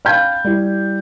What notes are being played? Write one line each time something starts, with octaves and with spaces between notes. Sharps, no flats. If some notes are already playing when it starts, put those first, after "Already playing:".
F5 G5 B5 G6 G#6
G3 E4